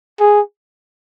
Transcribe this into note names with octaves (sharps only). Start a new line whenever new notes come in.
G#4